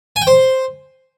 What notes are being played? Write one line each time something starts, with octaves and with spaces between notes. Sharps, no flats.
G#5
G5
C5